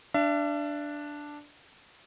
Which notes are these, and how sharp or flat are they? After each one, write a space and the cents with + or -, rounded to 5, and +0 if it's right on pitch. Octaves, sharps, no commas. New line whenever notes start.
D4 +0 E5 +40